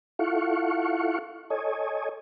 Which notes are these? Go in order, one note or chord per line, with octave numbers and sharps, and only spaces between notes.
E4 F4 A4 F5 F#5 C#6
A4 C#5 D#5 G#5